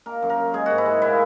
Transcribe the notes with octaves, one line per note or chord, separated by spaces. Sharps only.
A#3 A#4
F#2
A#4
F#2
G#3 G#4
G#2 F#4
E4
G#3
A#2 E4